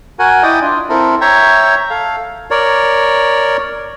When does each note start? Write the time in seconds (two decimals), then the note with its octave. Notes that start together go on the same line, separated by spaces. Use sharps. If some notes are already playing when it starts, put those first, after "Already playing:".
0.19 F#4 A#4 F#5 G#5
0.43 E4 D5 D#5 G5 D#6
0.62 D4 F4
0.89 C4 E4 A4 A#4
1.21 C#5 E5 G5 A#5
1.90 A4 F5
2.51 A#4 C#5 D5